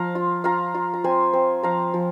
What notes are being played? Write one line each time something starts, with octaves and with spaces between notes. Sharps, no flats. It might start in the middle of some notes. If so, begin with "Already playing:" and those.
Already playing: F3 F5 A#5
F4
F4 F5 A#5
F4
A#5
C4 G#5 C6
C4
F3 F5 A#5
F3